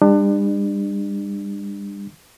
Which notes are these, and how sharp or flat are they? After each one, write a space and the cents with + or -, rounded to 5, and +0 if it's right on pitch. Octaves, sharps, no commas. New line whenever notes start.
G3 +40 D4 +30